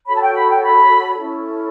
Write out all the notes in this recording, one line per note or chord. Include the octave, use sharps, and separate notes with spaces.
F#4 A4 C#5 B5
A5
G5
B5
G5
B5
C#4 E4 A4